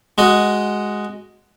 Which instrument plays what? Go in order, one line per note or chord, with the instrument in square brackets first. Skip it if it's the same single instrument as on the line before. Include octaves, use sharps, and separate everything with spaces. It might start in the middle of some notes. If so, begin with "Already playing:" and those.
[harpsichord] G#3 F#4 D#5